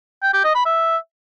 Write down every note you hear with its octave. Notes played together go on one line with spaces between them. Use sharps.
G5
G4
D#5
B5
E5